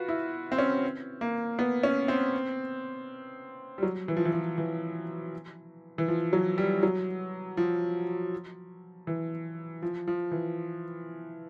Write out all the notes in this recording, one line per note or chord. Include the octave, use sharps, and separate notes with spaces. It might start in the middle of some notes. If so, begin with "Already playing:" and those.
Already playing: F4 F#4 B4
E4
C4
C#4
A#3
B3
C#4
C4
G3
F#3
E3
F3
E3
F3
E3
E3
F3
F#3
G3
F#3
F3
E3
F3
F3
E3